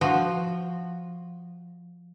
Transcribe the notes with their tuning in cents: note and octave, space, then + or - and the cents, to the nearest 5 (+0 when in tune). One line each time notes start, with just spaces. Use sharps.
F3 +0 F#4 +0